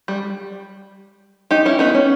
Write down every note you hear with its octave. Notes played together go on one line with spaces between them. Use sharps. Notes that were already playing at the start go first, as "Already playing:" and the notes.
G3
D#4 G4
C#4 E4
B3 D#4
C#4